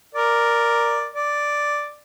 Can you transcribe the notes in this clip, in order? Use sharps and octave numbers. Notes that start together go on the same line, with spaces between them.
A#4 D5
D5